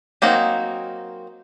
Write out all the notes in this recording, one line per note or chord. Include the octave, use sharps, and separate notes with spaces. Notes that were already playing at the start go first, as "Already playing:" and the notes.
F#3 A#3 C4 D#4